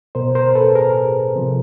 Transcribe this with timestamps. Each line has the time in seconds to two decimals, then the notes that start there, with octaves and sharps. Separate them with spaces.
0.15 B2 A#4 C5
0.35 A#4 C5
0.55 A4 B4
0.75 G#4 A#4
1.36 C3 F3